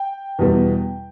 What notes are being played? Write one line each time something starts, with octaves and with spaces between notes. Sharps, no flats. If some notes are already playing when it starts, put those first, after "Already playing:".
Already playing: G5
E2 B2 G3 B3